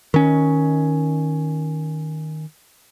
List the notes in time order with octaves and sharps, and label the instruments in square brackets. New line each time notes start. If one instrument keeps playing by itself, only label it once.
[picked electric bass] D#3 C#4